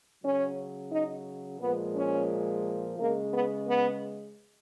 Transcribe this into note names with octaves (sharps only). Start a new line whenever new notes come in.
C#3 F#3 C#4
D#4
A#2 F3 G#3 B3
C#4
C#3 G#3 A#3
B3
B3